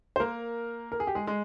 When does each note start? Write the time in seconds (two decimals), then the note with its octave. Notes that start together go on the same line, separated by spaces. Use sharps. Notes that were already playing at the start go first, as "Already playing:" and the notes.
0.16 C5
0.20 A#3 A#4
0.92 A#4
1.00 G#4
1.07 G4
1.15 G#3 G#4
1.27 G#3 G#4